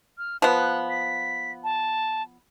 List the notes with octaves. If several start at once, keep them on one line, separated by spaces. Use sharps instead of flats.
F6
F3 B3 F#6
B6
A5